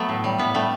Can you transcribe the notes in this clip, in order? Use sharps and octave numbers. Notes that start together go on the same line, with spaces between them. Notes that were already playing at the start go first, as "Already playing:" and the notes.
Already playing: F#3 A3 B3
A2
G3
A2 B3
G3 A3